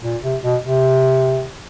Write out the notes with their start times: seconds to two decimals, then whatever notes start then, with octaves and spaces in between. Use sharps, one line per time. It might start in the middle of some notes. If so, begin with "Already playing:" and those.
0.03 A#2
0.23 C3
0.42 B2
0.63 C3